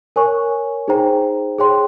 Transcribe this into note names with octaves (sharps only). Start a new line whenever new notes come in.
A#4 C#5 G#5 C#6
D#4 G#4 C5 G5 A#5
G#4 C#5 G5 C6